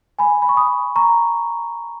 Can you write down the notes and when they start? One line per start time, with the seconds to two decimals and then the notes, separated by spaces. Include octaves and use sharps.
0.19 G#5 B5
0.42 B5
0.49 C#6
0.57 B5 D#6
0.96 A#5 C#6